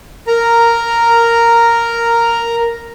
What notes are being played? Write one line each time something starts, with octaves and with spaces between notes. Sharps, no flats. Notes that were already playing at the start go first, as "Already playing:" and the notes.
A#4 A#5